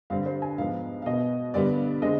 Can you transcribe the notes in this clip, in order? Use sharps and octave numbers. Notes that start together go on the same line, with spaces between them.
G2 D3 G3 C4 F5
C5
G#5
G#2 F3 B3 F5
F5
B2 B3 D#5
G2 D3 G3 B3 D5
D3 G#3 C4 D#5